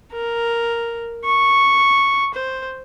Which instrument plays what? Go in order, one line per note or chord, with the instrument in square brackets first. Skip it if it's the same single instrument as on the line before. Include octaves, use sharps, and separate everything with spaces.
[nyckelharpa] A#4
C#6
C5